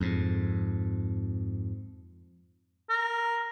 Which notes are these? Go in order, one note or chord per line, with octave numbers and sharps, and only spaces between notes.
F2 G#2
A#4